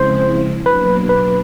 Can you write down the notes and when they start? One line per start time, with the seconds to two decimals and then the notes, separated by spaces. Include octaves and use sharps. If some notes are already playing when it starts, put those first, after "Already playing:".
Already playing: C#3 F3 G#3 C4 E4 C5
0.66 B2 F#3 A#3 D4 B4
1.09 B4